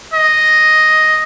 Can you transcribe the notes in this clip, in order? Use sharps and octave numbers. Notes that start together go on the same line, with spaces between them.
D#5